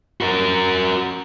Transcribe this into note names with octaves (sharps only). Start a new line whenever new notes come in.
F#4 A#4